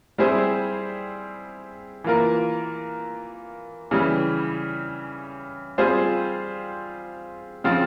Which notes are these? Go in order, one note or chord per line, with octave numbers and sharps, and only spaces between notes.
G3 C4 E4 G#4 C5
E3 A#3 F4 A#4
C#3 E3 G3
G3 C4 F4 G#4 C5
C#3 F3 C4 F4